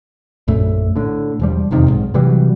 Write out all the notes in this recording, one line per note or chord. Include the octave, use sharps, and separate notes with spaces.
A#1 F#2 A3
A2 D3
E1 F3 G3
E1 F2 C3 D#3
B1 G#2
C3 E3 F#3 G3